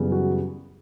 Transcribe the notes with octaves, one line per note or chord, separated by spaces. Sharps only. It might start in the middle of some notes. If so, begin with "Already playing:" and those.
Already playing: F#2 C#3 E3 G3 B3
F#4